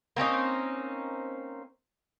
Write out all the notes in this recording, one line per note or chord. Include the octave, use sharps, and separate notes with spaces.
A#3 C4 C#4 D#4